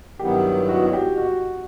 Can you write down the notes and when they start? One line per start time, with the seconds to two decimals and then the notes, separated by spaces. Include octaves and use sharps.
0.19 G2 D#3 F#3 B3 E4 G4
0.69 F#4
0.86 F#4
0.93 G4
1.18 F#4